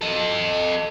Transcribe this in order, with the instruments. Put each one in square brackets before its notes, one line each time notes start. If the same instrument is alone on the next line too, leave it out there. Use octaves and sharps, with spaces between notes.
[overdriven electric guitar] A4 D#5